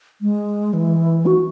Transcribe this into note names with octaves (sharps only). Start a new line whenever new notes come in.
G#3
E3
F#4